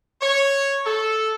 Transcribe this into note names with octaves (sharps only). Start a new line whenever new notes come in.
C#5
A4